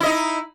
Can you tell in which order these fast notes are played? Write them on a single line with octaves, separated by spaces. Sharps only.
E4 D#5 D#4